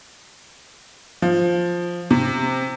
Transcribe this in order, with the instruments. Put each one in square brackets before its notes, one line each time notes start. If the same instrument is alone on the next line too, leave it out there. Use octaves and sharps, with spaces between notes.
[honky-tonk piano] F3
C3